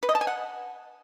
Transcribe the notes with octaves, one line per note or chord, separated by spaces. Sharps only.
B4
D#5
A5
G#5
F#5